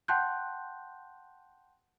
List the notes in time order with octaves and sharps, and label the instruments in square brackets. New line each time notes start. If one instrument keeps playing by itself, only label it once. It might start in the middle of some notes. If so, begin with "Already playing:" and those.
[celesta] F#5 G5 A5 C6 F#6 G6